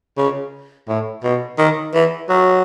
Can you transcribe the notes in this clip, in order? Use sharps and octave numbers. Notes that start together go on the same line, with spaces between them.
C#3
A2
B2
D#3
E3
F#3